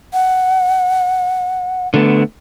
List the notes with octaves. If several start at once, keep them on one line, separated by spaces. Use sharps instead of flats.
F#5
D3 A3 B3